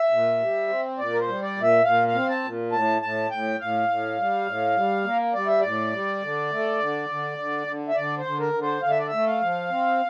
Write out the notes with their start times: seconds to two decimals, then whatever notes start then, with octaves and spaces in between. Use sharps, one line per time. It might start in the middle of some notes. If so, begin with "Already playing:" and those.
Already playing: E5
0.11 A#2
0.39 G3
0.68 C4
0.98 A#2 D5
1.13 A#4
1.20 C5
1.28 G3
1.42 D5
1.57 A#2
1.63 E5
1.85 A#2 F5
2.08 F5
2.15 C4
2.29 A5
2.44 A#2
2.72 A2 A5
3.02 A2 A5
3.31 A2 G5
3.60 A2 F5
3.88 A2
4.18 G3
4.47 A2
4.76 G3
5.05 A#3
5.34 G3 D5
5.47 E5
5.60 A2 D5
5.93 G3
6.22 D3
6.51 A3
6.80 D3
7.09 D3
7.38 D3
7.67 D3
7.88 E5
7.95 D3 D5
8.18 C5
8.26 D3
8.40 A#4
8.54 D3
8.62 C5
8.82 D3 F5
8.90 E5
8.99 D5
9.07 E5
9.12 A3
9.27 F5
9.41 F3
9.70 C4